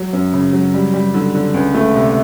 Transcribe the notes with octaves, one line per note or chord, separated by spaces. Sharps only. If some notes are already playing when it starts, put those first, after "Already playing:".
Already playing: F#3
F#2
C#3
F#3
G3
G3
D3
D3
C#2
A3
C3